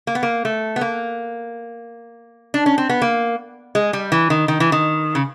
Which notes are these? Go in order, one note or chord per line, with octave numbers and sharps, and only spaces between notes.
A#3
B3
A#3
A3
B3
A#3
D4
C#4
C4
B3
A#3
G#3
G3
E3
D#3
D#3
E3
D#3
C#3